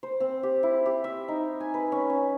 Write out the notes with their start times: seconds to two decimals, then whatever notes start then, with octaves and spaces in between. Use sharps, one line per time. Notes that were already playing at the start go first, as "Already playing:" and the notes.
0.03 C5
0.20 C4
0.43 G4
0.63 E4
0.86 G4
1.04 E5
1.28 D#4
1.60 G#5
1.74 B4
1.92 C#4
2.10 C#4